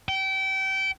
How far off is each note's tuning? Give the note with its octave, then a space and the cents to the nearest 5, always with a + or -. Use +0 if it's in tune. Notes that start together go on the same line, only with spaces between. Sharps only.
G5 -30